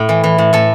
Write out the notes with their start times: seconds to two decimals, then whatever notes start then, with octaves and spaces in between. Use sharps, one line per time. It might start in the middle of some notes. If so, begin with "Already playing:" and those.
Already playing: A2
0.09 E3
0.24 E3
0.38 A2
0.53 A2 A4